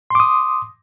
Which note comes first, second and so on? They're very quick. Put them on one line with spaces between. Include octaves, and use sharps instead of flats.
C6 D6 D#6